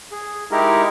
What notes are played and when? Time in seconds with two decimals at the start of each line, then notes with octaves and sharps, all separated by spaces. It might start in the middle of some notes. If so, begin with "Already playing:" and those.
0.12 G#4
0.51 G#3 D#4 E4 G4 A#4